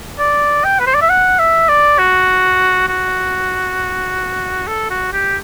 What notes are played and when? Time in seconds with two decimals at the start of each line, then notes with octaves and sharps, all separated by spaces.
0.19 D5
0.64 G5
0.80 B4
0.87 C5
0.95 D5
1.02 E5
1.10 F#5
1.39 E5
1.69 D5
1.99 F#4
2.88 F#4
4.68 A4
4.90 F#4
5.13 G4